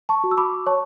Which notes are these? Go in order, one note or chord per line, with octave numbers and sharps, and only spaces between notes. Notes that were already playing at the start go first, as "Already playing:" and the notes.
A5 C#6
F#4
E6
B5 D6
C#5 A5 C#6